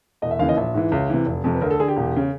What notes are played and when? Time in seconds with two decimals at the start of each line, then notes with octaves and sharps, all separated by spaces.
0.22 E1 D#5
0.31 E5
0.39 D#2 C#3 E3 F5
0.49 D#5
0.57 A#1 E5
0.74 G#2 E3
0.92 C#2
1.10 C3 E3
1.26 F1
1.44 F2 C3
1.54 B4
1.61 D2 A#4
1.71 A4
1.80 D3 G#4
1.88 G4
1.97 E1
2.16 C#3